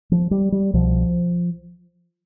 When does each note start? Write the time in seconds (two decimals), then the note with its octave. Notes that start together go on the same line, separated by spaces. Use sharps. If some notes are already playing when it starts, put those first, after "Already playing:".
0.12 F3
0.31 G3
0.52 G3
0.73 C2 B2 F3